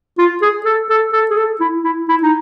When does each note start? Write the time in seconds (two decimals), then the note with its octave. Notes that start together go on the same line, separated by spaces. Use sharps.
0.18 F4
0.42 G#4
0.65 A4
0.89 A4
1.13 A4
1.30 G#4
1.37 A4
1.60 E4
1.84 E4
2.08 E4
2.23 D#4